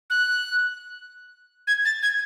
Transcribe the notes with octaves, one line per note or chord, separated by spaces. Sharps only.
F#6
G#6
A6
G#6